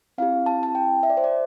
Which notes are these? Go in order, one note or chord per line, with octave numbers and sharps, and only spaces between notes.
C4 E4 G4 F5
A5
A5
G5
E5
D5
C5
D5